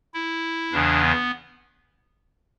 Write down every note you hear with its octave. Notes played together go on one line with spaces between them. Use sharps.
E4
E2 C#3 E3 D4
B3